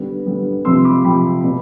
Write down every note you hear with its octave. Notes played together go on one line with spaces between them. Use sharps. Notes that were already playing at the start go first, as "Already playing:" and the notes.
Already playing: D3 G3 B3
D3 G3 B3
C3 F3 C4 C6 E6
B5 D6
C3 F3 C4 G5 B5
B2 B3